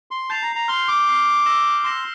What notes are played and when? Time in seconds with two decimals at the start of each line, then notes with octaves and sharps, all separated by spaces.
0.11 C6
0.30 A5 G6 C7 F7
0.43 A#5
0.56 A#5
0.68 C6 F6 C7 G7
0.88 D6
1.07 F6 C7 G7
1.46 E6 A#6 E7 G7
1.84 C6 E6 A#6 E7 G7